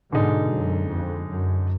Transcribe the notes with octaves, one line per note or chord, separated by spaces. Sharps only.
G#2 B2 D3 G#3 D#4
F#2
F2
F#2